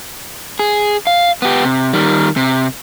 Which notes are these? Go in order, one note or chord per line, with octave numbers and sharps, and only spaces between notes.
G#4
F5
B3 G4
C3
D#3 G3
C3